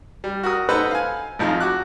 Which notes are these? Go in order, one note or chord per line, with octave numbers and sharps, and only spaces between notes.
G3
F#4 A#4 D#6
D#4 A4 B4 C5 F#5 B5
F5 G#5
G#1 F2 F3 D#4
F#4 D6 F#6